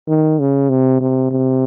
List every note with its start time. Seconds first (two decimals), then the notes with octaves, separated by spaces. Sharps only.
0.08 D#3
0.40 C#3
0.70 C3
1.00 C3
1.31 C3